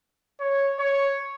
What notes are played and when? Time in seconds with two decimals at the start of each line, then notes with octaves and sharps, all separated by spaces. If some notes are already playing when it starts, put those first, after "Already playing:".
0.40 C#5
0.79 C#5